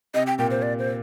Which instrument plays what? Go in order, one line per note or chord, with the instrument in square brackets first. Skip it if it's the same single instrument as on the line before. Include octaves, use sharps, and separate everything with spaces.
[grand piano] C3 [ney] D#5
[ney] G5
[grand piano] A#2 [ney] G5
[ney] C5
D5
C5